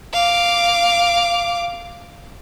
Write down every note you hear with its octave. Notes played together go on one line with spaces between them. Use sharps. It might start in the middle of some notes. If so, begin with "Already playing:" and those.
F5 D6